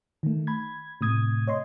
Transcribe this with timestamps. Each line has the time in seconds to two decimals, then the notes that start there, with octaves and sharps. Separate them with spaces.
0.23 D#3 A3
0.47 B5 G#6
1.01 A2 C3 D#6 G#6
1.47 C#5 D#5 C6